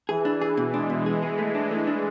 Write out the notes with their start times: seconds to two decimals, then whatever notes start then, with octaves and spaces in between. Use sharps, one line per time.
0.09 E3 G#4
0.25 D4
0.41 G#4
0.57 B2
0.74 G#3 D4
0.90 B2
1.06 G#4
1.22 G#4
1.39 A3
1.55 D4
1.71 A3
1.87 D4